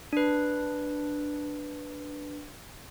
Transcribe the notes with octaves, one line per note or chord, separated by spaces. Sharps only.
D4 B4